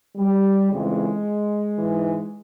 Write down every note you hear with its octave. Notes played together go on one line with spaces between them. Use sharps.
G3
F2 C#3 E3 G#3
G#2 E3